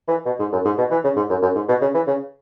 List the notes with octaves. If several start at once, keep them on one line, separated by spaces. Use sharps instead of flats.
E3
B2
G#2
F#2
G#2
B2
E3
C#3
G#2
F#2
F#2
G#2
B2
C#3
E3
C#3